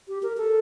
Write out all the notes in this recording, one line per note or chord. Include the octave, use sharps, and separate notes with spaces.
G4
A#4
A4